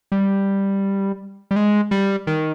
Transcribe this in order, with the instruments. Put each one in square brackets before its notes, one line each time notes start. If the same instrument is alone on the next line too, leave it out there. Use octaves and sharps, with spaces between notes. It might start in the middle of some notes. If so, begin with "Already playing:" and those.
[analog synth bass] G3
G3
G#3
G3
D#3